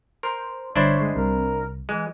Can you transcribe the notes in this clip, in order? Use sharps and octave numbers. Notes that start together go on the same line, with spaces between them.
A#4 C5
G1 D4 E4 C5 C#5 C7
G#3
C2 A#4
E3 G#3